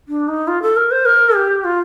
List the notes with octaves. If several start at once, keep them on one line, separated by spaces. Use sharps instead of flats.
D4
D#4
F4
A4
A#4
C5
A#4
G4
F4